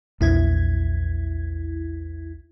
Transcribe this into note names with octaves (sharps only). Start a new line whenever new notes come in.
A#1 E2 E4 G#6